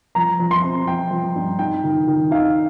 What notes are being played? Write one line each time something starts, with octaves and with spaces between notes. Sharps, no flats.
F3 A#5
F3
C6
C4
F3 G5
F3
G2
D#4 G5
D#3
D#3
D#4 F5